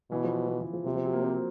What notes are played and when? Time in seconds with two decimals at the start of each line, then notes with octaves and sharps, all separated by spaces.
0.11 B2 E3
0.24 F3
0.48 F3
0.61 E3
0.73 F3
0.85 C3 F3
0.96 F3
1.05 F#3
1.13 A#3
1.24 C4